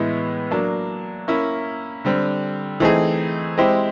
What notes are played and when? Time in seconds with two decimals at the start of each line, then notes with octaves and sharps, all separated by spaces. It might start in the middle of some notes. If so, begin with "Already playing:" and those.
Already playing: A2 E3 G#3 B3 E4
0.51 F#3 A#3 D4
1.28 A#3 C#4 E4
2.05 D3 G3 C4
2.80 E3 A3 C4 D#4 G#4
3.58 G#3 C4 E4 G4 C5